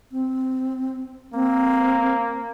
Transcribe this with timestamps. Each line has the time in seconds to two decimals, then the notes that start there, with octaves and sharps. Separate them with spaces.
0.12 C4
1.34 A#3 C4